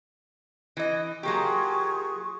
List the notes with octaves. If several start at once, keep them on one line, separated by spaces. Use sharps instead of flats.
E3 D#5
F#3 A#3 F4 G4 G#4 C#6